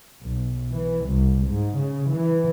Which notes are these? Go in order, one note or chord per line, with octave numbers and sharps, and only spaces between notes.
B1
E3
C2
G#2
C#3
E3